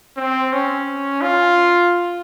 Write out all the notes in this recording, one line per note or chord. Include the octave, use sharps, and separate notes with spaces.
C4
C#4
F4